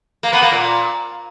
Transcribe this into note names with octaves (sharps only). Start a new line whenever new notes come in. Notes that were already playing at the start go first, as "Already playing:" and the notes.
A#3
B3
A#3
A#2